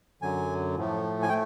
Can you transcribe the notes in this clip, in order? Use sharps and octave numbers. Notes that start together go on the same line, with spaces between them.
F#2 D3 F#3 G#5
A2 F3 A3
G#5
A3 G5